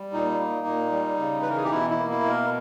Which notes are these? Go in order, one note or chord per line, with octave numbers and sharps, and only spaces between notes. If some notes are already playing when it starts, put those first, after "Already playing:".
Already playing: G3
A#2 D#4
A#3
A#2
G3
C#3
E3 B4
A#4
G#4
G4
B2 E4
E4
A#3
E4
B2
A#4